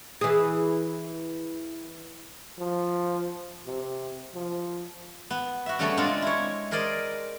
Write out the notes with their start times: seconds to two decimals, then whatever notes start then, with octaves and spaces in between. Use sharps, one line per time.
0.21 E3 G#4
2.59 F3
3.66 C3
4.34 F3
5.30 B3
5.66 F#4 E5
5.79 C#3 G3 A3 B3 C#4 A4
5.97 G#3 C4 D4 F4
6.22 E4 C#5
6.71 G#4 A#4 C5 D5 D#5